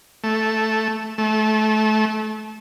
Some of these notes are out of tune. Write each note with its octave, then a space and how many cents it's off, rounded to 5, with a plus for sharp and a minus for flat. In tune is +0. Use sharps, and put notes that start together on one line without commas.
A3 +0
A3 -25